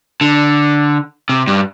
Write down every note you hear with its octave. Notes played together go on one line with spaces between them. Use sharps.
D3
C3
G2